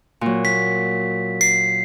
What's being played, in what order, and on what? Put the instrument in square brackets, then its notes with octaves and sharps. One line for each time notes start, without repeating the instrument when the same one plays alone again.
[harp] A#2 F#3
[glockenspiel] B6
C7